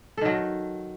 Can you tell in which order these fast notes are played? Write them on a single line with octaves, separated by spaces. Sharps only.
A4 D#3 F#3